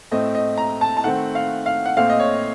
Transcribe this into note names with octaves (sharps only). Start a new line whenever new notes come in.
A2 A3 C4 D#5
D#5
A#5
A5
A5
D#3 A3 C4 F#5
F5
F5
F#5
A#2 A3 C4 F5
D#5
C#5